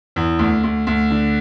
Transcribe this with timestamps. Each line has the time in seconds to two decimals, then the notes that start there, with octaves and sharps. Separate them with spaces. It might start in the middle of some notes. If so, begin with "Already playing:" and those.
0.16 E2
0.39 D2
0.63 D2
0.87 D2
1.11 D3